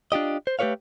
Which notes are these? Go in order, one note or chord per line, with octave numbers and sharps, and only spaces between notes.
D4 F4 G4 D#5
C5
A3 G4 G#4 B4 C#5 F5